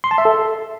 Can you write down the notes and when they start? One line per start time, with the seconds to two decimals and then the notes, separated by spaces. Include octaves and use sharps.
0.04 C6
0.11 A5
0.18 E5
0.25 A4